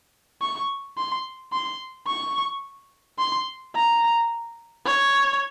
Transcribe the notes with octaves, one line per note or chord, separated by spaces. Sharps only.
C#6
C6
C6
C#6
C6
A#5
C#5